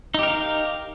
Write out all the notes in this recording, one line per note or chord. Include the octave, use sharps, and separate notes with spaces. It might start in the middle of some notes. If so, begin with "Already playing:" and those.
D#4 G4 A#4 F5